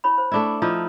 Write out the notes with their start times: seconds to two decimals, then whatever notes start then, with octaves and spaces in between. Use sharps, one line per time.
0.04 E4 C#5 B5
0.18 C5
0.32 A3 D4 E4
0.62 F3 D#4 E4